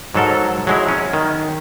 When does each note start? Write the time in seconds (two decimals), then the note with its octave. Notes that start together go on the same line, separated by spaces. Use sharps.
0.15 G#2 F#3 A4 A#4
0.67 F#3 G#3 E4
0.89 C#4
1.14 D#3